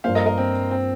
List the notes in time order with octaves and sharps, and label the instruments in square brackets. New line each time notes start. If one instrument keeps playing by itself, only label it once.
[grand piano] G2 F3 A#3 [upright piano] C5 F5
[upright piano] A#4 D#5
A#4 D#5
C4
C4